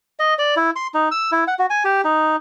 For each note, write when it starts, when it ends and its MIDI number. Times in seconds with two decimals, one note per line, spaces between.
0.19 0.34 75
0.39 0.55 74
0.56 0.70 64
0.76 0.87 84
0.94 1.09 63
1.11 1.31 88
1.32 1.44 64
1.47 1.54 78
1.59 1.66 66
1.70 1.83 80
1.85 2.01 67
2.05 2.36 63